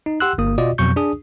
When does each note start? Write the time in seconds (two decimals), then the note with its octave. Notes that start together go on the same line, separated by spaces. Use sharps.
0.06 D#4
0.20 G4 F#5 C6 E6 F#6
0.38 G1 A#3 D#6
0.58 B2 F4 F#4 D5 D#5
0.78 F2 B2 F#3 C#6 G6
0.96 D4 G#4 D#6